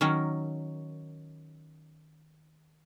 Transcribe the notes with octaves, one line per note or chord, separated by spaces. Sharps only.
D#3 F#3 C#4 A#4